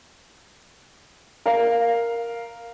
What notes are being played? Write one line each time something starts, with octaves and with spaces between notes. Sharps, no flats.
A#4 F5